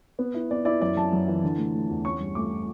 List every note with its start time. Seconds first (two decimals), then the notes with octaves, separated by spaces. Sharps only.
0.19 B3
0.34 E4
0.51 B3 D5
0.65 E4 D5
0.81 F#2 D5
0.96 F#2 A5
1.13 F#2
1.28 E3
1.43 D3
1.58 A3
1.74 A3
1.90 E2
2.05 C#4 C#6
2.20 G2
2.35 A3 D6